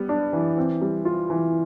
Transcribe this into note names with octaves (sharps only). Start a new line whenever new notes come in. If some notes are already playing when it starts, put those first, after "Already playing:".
Already playing: G3 B3
D4
E3
C4
G3
F4
E3